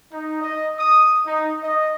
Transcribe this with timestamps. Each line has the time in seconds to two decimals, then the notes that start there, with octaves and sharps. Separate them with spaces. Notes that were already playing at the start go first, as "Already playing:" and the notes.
0.13 D#4
0.41 D#5
0.78 D#6
1.26 D#4
1.62 D#5